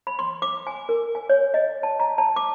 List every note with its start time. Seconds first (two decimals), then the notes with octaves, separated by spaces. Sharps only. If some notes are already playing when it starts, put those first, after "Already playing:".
0.07 B5
0.19 C6
0.42 D6
0.67 G#5
0.89 A#4
1.15 G#5
1.29 C#5
1.54 D#5
1.83 A5
2.00 A#5
2.18 A5
2.36 D6